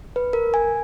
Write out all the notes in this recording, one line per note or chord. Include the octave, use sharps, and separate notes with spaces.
B4
A#4
G#5